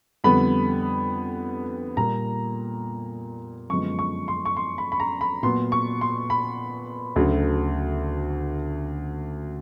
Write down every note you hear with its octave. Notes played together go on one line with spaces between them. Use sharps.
F2 D3 G3 B3 B5
A#2 G3 A#3 A#5
F#2 D3 F3 G#3 B3 C#6
C#6
C6
C#6
C6
B5
B5
A#5
B5
A#2 F#3 B3 C6
C#6
C6
B5
D2 C#3 F#3 A3